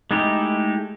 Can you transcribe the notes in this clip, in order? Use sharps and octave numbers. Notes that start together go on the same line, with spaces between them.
G#3 A3 D#4 E4 G4